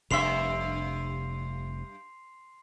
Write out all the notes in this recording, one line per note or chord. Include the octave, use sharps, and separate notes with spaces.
F1 G2 C3 E5 C6 C7 F7